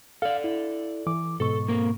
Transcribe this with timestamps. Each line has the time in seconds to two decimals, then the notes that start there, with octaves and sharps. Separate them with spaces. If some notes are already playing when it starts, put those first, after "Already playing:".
0.22 A4 D5 F5
0.44 E4
1.07 E3 D6
1.40 G#2 B2 A4 C#6
1.68 A#3 C4 A#4